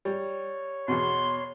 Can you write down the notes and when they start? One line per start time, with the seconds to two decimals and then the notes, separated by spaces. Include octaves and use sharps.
0.05 G3 C#5
0.88 E2 B2 C6